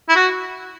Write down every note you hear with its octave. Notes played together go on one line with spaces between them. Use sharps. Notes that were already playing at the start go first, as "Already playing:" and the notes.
E4
F#4